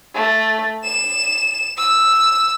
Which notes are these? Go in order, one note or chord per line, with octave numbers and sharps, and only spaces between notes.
A3
E7
E6